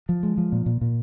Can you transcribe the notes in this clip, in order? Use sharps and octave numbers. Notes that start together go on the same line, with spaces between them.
F3
G#3
F3
A#2
A#2
A#2